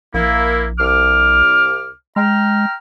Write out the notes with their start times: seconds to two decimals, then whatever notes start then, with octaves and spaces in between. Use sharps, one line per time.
0.14 A#1 A#3 E4
0.79 C2 D6 F6
2.16 G#3 G5 A#5 F6